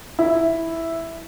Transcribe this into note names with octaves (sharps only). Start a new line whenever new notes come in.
E4